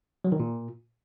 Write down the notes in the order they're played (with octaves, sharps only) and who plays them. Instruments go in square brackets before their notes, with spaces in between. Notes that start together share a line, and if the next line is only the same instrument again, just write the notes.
[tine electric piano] F#3
D#3
A#2